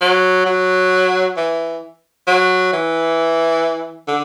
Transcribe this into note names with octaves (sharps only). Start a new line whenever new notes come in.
F#3
F#3
E3
F#3
E3
D3